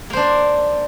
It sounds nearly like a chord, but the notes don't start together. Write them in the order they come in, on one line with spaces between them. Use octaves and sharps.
A#3 C5 D4